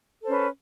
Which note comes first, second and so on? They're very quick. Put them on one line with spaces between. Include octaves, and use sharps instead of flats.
A4 C5 C#4 B4